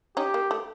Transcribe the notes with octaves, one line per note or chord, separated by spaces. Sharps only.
C#4 D#4 G4
A#3
A3